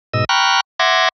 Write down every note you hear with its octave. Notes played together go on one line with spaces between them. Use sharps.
G#2 B2 D#5 E6
G5 A#5 B5 C#6 F6 F#6
E5 F#5 C6 D6 G#6 A#6